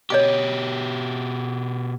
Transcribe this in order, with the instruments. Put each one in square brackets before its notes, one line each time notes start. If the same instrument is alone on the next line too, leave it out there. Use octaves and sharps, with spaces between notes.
[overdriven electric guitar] B2 G4 [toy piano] C#5 D#5 D6